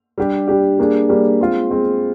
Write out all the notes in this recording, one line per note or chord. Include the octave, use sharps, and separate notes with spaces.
G3 D4 G4
G3 D4 G4
G3 A#3 D4 G#4
G3 A#3 D4 G#4
G#3 C4 F4
G#3 C4 F4